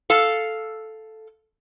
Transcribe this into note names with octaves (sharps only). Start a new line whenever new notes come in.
A4 F5